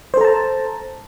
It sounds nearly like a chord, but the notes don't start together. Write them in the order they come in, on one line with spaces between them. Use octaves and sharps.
C5 A4 A#5 A5